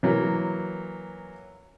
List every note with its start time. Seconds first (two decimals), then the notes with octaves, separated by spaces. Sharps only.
0.03 E3 F#3 A#3